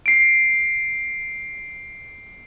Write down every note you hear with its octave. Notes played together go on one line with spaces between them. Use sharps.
C7 D7